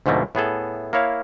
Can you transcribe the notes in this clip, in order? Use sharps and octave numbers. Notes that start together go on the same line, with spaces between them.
D2 G#2 B2 F3 A3 A#3
A2 B3 G#4 A4
A#3 E4 C#5 F5